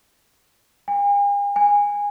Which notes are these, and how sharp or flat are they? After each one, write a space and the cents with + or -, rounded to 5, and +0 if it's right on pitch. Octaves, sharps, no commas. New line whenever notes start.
G#5 -45
G#5 -20